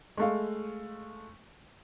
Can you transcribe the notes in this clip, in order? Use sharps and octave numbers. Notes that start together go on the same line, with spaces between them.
G#3 A3 F5